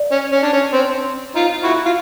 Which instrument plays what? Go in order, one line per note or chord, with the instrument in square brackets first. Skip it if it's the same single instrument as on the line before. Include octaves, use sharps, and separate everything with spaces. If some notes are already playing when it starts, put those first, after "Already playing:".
Already playing: [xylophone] D5
[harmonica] C#4
C#4
D4
C#4
C4
D#4 F4
E4 F#4
F4